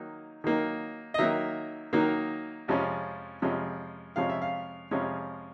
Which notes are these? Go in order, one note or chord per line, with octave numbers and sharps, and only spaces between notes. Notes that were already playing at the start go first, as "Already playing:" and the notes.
Already playing: D#3 F#3 A#3 D#4
D#3 F#3 A#3 D#4
D#5
D#3 F#3 A#3 D#4 E5
D#3 F#3 A#3 D#4
F2 C3 F3 G#3 C#4
F2 C3 F3 G#3 C#4
F2 C3 F3 G#3 C#4 F5
E5
F5
F2 C3 F3 G#3 C#4